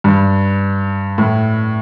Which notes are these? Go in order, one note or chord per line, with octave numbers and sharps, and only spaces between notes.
G2
A2